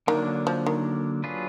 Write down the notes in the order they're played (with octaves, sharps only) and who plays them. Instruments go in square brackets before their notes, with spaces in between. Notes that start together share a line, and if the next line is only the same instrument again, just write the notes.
[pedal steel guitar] D3 F#3 A#3 D4 [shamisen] D#3
[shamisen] F3
D#3
[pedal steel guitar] F#3 D4 F4 G#4 B4